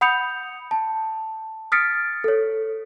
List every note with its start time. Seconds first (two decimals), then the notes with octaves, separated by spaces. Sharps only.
0.01 F#5 B5 D#6 G6 C#7 F7
0.71 A5
1.72 D#6 F6 A6 B6 C#7 D7
2.24 A4 C#5